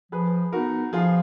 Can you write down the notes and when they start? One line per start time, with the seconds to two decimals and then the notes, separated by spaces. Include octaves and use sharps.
0.12 F3 G#4 B4
0.52 B3 D#4 F#4 A#4
0.92 F3 F4 G#4